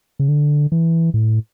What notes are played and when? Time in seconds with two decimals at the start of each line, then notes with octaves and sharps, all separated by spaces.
0.19 C#3
0.28 D3
0.72 E3
1.14 A2